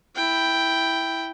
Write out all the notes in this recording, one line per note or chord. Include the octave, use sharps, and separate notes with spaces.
E4 G5